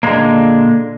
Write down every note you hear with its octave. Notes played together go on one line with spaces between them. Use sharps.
A#2 D3 E3 G#3 A#3